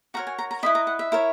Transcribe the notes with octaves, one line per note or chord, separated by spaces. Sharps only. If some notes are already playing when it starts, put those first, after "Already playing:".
F#4 A#4 C#5 A#5
G#5
A#5
A#5
E4 B4 D#5 B5
A#5
F#5
E5
E4 A#4 C#5